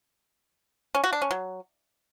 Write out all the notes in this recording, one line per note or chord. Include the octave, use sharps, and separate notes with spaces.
C#4
F#4
D4
C#4
F#3